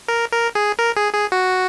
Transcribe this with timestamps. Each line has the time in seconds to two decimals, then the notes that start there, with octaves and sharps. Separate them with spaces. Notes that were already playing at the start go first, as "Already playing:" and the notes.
0.08 A#4
0.32 A#4
0.55 G#4
0.79 A#4
0.97 G#4
1.14 G#4
1.32 F#4